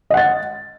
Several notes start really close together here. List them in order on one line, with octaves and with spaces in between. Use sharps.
D#5 F#5 A6